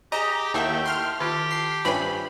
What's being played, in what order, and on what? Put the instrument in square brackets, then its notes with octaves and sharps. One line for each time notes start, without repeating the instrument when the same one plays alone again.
[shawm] G4 [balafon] G#4 G#5 [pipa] D#5 [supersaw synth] A#5
[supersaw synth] D#2 E5 [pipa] A3 A#3 [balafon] E4 F#5 [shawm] G5
[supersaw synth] C6 F6
[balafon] D#3 F4 [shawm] G4 [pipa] A4
[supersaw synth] C7
[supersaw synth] G2 B5 [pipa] C4 C#4 [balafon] F4 B4 E5